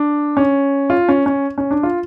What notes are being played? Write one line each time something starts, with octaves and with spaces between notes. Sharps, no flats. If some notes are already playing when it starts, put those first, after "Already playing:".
Already playing: D4
C#4
F4
C#4
C#4
C#4
D4
F4